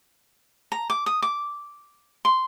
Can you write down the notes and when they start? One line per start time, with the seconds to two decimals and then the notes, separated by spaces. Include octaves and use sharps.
0.72 A#5
0.90 D6
1.06 D#6
1.22 D6
2.25 C6